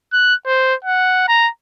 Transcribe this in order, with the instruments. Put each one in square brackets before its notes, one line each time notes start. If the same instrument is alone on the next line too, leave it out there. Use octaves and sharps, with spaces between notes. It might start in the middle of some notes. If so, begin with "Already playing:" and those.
[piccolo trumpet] F#6
C5
F#5
A#5